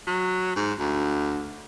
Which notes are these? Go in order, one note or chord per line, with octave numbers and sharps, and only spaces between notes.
F#3
G#2
D2